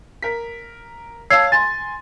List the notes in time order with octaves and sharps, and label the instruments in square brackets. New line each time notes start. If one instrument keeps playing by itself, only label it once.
[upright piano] A#4 B6
[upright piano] C#5 F5 A5 [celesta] E6 G#6 C7
[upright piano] G#5 C6 [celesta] A6